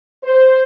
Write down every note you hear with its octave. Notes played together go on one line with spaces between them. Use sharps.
C5